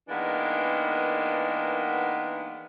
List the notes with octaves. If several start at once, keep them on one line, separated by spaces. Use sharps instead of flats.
D#3 E3 G#3 A#3 B3 D4